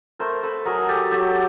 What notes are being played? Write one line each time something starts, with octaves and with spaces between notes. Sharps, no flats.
A3 A#4 C5
A4 B4
F#3 G#4 A#4
G4 A4
F#3 G4 A4